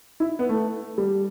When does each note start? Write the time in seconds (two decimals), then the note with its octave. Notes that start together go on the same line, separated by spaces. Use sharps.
0.20 E4
0.39 B3
0.49 A3
0.98 G3